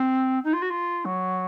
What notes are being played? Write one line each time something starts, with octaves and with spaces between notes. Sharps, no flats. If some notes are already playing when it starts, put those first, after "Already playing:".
Already playing: C4
D#4
F4
F#4
F4
F#3